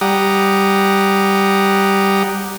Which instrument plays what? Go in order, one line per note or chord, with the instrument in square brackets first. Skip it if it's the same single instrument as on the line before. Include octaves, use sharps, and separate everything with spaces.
[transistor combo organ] G3 G4 F#5 A#5 D#6